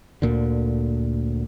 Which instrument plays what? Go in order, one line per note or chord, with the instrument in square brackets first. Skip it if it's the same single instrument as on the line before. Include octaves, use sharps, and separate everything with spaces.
[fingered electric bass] D2 A#2 D3